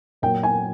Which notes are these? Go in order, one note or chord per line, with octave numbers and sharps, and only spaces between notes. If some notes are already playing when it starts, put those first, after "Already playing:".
A#2 F#3 A#3 G5
G#5